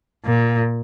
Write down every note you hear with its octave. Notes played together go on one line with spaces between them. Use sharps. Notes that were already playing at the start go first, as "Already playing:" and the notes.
A#2